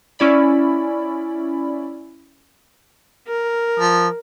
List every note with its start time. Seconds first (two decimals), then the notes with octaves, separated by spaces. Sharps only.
0.19 C#4 E4 D5 B5
3.28 A#4
3.79 F3